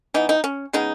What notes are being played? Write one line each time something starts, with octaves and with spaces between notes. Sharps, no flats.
E3 B3 D#4
D#4
C#4
C#3 G#3 B3 D#4